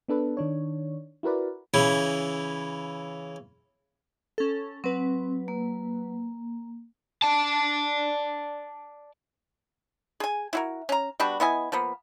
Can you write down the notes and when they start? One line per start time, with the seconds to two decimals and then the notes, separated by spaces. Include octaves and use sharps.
0.08 B3 D4 A4 B4
0.37 D#3 D4 C#5
1.23 E4 F#4 A#4 B4 D5
1.74 C#3 E3 E4
4.38 C#4 A4
4.84 F#3 C4 B4
5.48 A#3
7.22 D5 A5
10.20 G#4 G#5
10.53 E4 F#4 A#4
10.89 C#4 A#5
11.20 G3 B3 D4 F#4
11.40 B3 E4 D#5 G#5
11.72 F3 A#3 B3